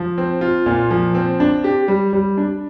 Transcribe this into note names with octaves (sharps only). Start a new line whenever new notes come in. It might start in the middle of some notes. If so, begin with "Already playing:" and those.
Already playing: F3
C4
F4
A#2
F3
C4
D4
G4
G3
G3
D4